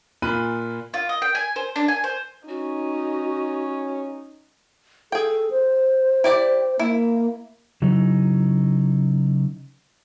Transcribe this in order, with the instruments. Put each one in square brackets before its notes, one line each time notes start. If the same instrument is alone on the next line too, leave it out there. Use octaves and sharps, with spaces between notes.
[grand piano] A#2 F4 B5 F#6 D#7
[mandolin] F4
D#5
G5
G#5
C5
D4
G#5
C5
[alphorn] C#4 [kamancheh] D#4 [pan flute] F#4
[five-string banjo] G#4 G5 [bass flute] A4
[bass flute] C5
[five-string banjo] E4 G4 D5
[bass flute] A#3 [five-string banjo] E4
[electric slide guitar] C#3 F#3 D#4 E4